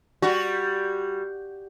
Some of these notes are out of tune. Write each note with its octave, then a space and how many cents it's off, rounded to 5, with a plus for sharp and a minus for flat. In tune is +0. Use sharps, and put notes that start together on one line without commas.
G3 +0 F#4 +0